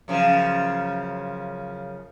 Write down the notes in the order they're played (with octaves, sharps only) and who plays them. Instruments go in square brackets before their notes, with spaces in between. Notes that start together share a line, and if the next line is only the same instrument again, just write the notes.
[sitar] F#2 C#3 F3